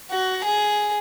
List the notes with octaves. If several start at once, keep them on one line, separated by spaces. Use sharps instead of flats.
F#4
G#4